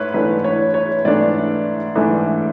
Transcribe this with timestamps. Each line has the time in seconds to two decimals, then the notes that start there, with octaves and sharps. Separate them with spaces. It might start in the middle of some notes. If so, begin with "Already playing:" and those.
Already playing: G#2 A3 B4 C#5
0.14 G#2 E3 A3 D4 B4
0.44 C#5
0.74 C#5
1.05 G#2 E3 A3 D4 D5
1.95 G#2 E3 A3 D4